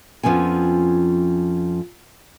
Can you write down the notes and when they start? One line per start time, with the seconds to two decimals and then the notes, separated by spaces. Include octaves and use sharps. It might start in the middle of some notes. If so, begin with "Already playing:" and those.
0.23 F2 F3 B3 C#4 G#5